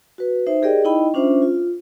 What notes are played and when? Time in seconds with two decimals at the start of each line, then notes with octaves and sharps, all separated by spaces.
0.18 F#4 B4
0.47 D#4 C5 E5
0.62 G4 G#4 A#4 D5 D#5 G5
0.85 D#4 E4 D#5 G5 B5
1.14 C#4 D4 F4 C5 E5
1.42 F4